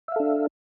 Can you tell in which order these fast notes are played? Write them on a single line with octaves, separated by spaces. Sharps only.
E5 F5 A4 D4